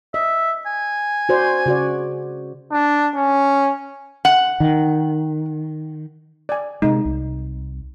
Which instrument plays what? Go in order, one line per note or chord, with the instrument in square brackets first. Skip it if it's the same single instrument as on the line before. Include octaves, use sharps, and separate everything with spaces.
[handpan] D#5 [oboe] E5
[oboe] G#5
[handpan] F#4 C5 D5
C#3 F#4 D5
[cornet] D4
C#4
[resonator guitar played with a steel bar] F#5
[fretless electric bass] D#3
[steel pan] D5 G#5
[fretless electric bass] C3 G#3 [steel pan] D#4
[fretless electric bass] C2